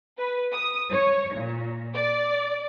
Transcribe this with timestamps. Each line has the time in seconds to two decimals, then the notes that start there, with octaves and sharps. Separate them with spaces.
0.18 B4
0.53 D#6
0.91 C#5
1.35 A#2
1.94 D5